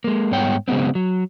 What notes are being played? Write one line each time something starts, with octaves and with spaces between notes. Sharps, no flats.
G#3 A#3
G#2 G3 B3 C#5 G5
C#3 F#3 G#3 B3 C4
F#3